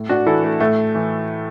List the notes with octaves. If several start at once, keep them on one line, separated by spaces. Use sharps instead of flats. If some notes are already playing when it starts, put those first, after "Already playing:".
Already playing: A2
D4 F#4
E3 E4 A4
A3
A2 A3
E3